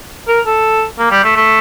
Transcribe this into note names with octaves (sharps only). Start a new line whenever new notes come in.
A#4
A4
A#3
G3
A3
A3